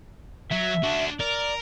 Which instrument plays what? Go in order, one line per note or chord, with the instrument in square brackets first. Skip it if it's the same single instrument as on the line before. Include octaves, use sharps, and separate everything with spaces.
[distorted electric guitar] F#3 [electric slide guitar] E5
[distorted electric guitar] D4 F#4
[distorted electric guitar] A#4 [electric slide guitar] D5